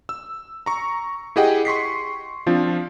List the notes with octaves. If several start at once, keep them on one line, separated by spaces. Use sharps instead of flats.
E6
A#5 C#6
E4 G4 G#4 D#5 F#5 G5
C6 C#6 B6 C7
F3 C4 D4 F4